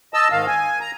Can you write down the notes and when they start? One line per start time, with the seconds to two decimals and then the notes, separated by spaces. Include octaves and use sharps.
0.14 D#5 A5 E6
0.31 G#2 D#3 F5
0.47 G#5
0.81 A#5